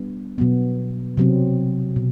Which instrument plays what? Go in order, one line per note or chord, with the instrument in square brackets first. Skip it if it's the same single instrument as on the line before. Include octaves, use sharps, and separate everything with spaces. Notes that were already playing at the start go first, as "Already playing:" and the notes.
Already playing: [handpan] G3 B3 D4
B2 F#3 B3
C3 F#3 C4
B2